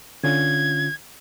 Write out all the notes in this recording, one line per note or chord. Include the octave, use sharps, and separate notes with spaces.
D3 C#4 F4 G#6